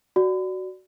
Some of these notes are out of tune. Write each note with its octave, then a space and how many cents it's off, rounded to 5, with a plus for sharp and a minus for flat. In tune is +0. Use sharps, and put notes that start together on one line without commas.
F#4 +10 D5 +0